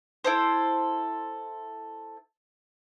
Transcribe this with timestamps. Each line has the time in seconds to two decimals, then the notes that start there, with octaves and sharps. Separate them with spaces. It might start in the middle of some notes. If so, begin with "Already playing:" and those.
0.24 E4 A4 C5